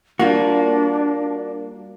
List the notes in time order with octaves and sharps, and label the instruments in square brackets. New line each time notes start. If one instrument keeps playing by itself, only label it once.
[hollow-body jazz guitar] G3 F4 F#4 [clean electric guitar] A#3 [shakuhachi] D4